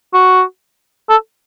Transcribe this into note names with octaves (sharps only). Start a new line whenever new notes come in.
F#4
A4